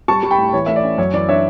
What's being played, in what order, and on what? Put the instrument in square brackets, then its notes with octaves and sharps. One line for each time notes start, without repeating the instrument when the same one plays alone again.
[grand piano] G3 A5 C#6
G3
G5 B5
A2
E3 C#5
A3 E5
D5
C#4
F#2 C#5
E3 D5
D4 C#5 E5